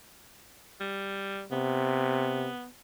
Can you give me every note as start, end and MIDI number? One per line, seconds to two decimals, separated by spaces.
0.81 1.44 55
1.52 2.49 48
1.52 2.66 59